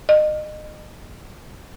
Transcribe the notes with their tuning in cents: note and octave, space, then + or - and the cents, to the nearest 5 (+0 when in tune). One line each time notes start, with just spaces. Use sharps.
D#5 -30